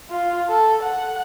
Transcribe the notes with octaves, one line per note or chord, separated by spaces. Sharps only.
F4
A4
F#5